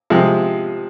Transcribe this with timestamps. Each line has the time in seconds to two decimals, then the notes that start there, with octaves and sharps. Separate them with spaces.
0.10 C3 F3 G#3